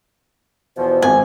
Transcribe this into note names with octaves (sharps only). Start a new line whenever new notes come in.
E2 B2 F3 C5
G#1 C5 G#5